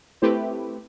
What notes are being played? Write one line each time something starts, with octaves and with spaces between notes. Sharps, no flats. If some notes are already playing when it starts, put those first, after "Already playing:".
A3 C4 E4 G4 B4